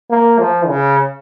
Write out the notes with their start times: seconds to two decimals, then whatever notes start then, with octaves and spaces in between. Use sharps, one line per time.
0.10 A#3
0.39 F3
0.67 C#3